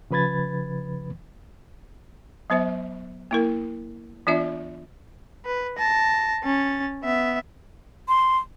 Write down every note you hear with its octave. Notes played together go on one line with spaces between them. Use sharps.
C#3 F3 B4 B5 G#6 A6
F#3 B3 C5 E5
A#3 E4 A#4
E3 B3 D4 F4 D5 E5
B4
A5 A#6
C#4 A6
B3 E5
C6